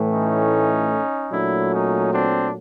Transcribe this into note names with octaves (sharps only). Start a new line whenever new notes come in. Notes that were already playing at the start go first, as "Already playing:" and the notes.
Already playing: A2 E3 A3
C#4 D#4
A#2 F#3 A3 D4 E4
C#4 D#4
C4 D4